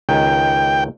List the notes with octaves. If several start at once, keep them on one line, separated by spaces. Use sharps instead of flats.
C#2 D#3 G5 G#5